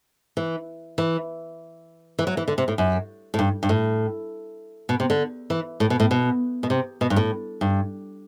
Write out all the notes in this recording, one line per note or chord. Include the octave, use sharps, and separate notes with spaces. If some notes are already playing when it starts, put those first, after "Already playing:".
E3
E3
E3
F#3
E3
D3
C3
A2
F#2
A2
G2
G2
A2
B2
C3
D3
E3
A2
B2
A2
B2
B2
C3
B2
G2
A2
G2